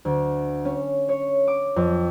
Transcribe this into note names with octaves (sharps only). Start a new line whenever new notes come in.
D2
C#4
C#5
D6
F2